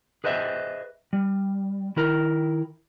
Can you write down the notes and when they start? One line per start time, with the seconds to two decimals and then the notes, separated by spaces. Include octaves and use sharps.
0.24 G#4 B4 C5 D#5 E5
1.13 G3
1.96 D#3 E4 A#4